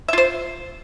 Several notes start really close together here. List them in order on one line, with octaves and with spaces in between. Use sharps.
E5 F4 C5